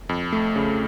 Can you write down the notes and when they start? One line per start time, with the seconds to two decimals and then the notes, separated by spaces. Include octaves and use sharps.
0.09 F2
0.33 A3
0.56 C#3